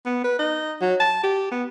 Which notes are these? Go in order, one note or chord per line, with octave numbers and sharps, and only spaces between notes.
B3
B4
D#4
F#3
A5
G4
B3